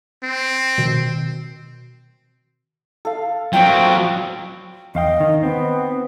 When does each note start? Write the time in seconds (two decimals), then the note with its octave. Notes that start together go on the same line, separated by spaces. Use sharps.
0.23 C4
0.78 B2 D#3
3.05 A4 F5
3.53 F#3 A#3 C4 F4 D5 G5
4.95 E2 D#5 F5 G5
5.20 D#3
5.43 B3 C4